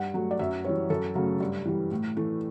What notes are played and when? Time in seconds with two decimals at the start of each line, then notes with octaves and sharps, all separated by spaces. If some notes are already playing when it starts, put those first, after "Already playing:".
Already playing: G2 F#5
0.14 F#3 A3
0.31 D5
0.39 F#2 E5
0.65 E3 G3 C#5
0.90 F#2 A4
1.15 C#3 F#3 A3
1.41 G2
1.65 E3 G3
1.91 A2
2.17 E3 A3